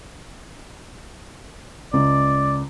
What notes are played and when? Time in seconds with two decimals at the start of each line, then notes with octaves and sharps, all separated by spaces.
1.93 C#2 D5